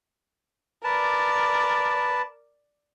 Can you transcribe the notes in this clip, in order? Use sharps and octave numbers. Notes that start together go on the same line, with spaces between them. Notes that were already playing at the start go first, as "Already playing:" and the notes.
A#4 B4 D5 A5